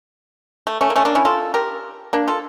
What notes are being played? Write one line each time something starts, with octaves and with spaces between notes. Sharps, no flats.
A3
A3 C#4
A#3
A3 C#4
A#3 D4
C#4 E4
F4 A4
G4 A#4
A#3 D4
F4 A4